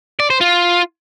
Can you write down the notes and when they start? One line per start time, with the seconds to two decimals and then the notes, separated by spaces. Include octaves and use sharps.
0.20 D5
0.30 C5
0.41 F4